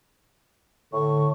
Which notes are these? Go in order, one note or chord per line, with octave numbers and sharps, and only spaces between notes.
A2 D3 C#6